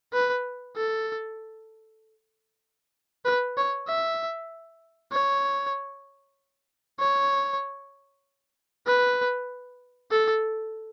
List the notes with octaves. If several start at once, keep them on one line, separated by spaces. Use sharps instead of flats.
B4
A4
B4
C#5
E5
C#5
C#5
B4
A4